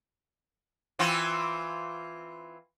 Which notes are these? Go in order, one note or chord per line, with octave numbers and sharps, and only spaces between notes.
E3 C4 F4